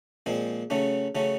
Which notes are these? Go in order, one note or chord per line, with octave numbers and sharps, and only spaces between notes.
A#2 F3 G#3 C4
C#3 F#3 A3 C#4
C#3 F#3 A3 C#4